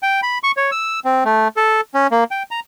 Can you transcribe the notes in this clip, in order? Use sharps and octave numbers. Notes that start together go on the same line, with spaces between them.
G5
B5
C#6
C#5
E6
C4
A3
A4
C#4
A#3
G5
A#5